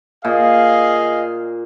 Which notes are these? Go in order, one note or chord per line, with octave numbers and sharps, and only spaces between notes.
A#2 G#4 D#5 F5